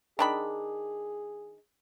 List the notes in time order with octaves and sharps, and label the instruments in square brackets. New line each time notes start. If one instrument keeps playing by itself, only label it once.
[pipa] D#3 D4 B5 [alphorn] G#4